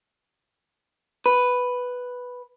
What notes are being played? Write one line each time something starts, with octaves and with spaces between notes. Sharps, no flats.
B4